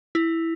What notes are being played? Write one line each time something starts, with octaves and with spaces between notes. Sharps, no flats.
E4